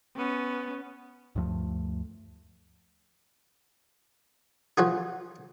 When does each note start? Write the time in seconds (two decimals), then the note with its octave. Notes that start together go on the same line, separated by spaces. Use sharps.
0.16 B3 C#4
1.35 D2 G2 F3 A3
4.78 F3 F4 F#4 G#4